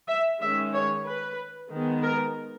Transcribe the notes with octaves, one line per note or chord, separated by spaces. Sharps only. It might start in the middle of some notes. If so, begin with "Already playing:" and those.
E5
D#3 G#3 C#4 E5
C#5
B4
D#3 G#3 B3
A#4